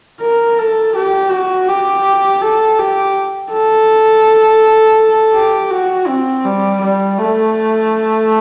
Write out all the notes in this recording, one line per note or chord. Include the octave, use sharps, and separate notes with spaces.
A#4
A4
G4
F#4
G4
A4
G4
A4
G4
F#4
C4
G3
G3
A3